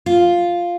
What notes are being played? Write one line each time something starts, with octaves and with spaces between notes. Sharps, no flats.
F4